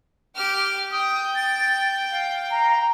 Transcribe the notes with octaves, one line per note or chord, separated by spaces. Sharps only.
G4 F6
G5 D#6
A6
F5
A#5